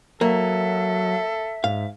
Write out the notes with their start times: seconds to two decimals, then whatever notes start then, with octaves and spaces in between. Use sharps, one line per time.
0.21 F#3 A#3 A4 E5
1.64 G#2 F5